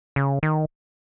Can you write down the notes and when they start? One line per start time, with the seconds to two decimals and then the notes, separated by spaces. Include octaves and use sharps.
0.16 C#3
0.43 D#3